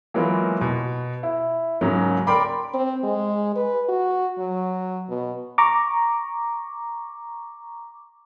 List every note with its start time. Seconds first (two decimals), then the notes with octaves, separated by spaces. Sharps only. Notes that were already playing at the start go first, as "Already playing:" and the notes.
0.14 E3 F#3 G#3 A#3 B3 F4
0.61 B2
1.23 E4
1.81 G#2 C#3 F#3 A#3
2.27 A#4 D5 G5 B5 C6 D6
2.74 C4
3.04 G#3
3.56 B4
3.89 F#4
4.39 F#3
5.09 B2
5.58 A#5 C#6 D6